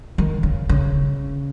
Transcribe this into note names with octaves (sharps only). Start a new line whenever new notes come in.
D#3
C#3
C#3